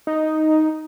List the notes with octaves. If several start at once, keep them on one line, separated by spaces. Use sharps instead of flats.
D#4